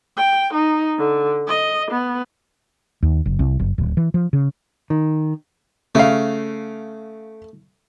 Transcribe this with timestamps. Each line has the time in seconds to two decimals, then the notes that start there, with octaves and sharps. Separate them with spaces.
0.17 G5
0.53 D#4
0.98 D3
1.47 D#5
1.91 B3
3.03 D#2
3.26 F#1
3.39 C2
3.60 F#1
3.78 D1
3.97 E3
4.14 F3
4.33 C#3
4.90 D#3
5.95 C#3 A3 F5